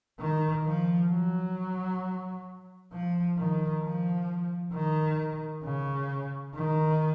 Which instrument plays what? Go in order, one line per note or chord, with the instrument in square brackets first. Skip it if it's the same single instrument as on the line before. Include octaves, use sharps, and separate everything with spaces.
[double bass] D#3
F3
F#3
F3
D#3
F3
D#3
C#3
D#3